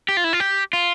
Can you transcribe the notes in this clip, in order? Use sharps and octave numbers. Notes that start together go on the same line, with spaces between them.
G4
F4
E4
F4
G4
F4